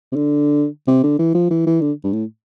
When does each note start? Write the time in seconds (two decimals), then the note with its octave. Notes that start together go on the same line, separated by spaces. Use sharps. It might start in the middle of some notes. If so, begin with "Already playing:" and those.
0.12 C3
0.16 D3
0.88 C3
1.04 D3
1.19 E3
1.35 F3
1.51 E3
1.67 E3
1.81 D3
2.04 G2
2.13 A2